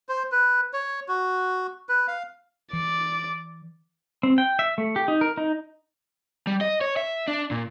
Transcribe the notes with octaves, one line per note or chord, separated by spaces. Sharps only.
C5
B4
C#5
F#4
B4
F5
E3 D5
C4
G5
E5
A3
G4
D#4
A#4
D#4
G3
D#5
C#5
E5
D4
A#2